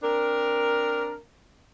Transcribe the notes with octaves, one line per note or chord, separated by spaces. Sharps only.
C4 D4 A#4